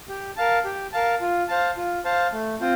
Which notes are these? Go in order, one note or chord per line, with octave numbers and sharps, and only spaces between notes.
G4
A#4 F5 A5
G4
A#4 F5 A5
F4
C5 F5 A5
F4
C5 F5 A5
A3
C4 F4 C5